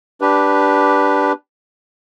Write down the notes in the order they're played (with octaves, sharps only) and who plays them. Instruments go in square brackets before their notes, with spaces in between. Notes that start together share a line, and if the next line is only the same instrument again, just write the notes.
[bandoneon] D4 G4 B4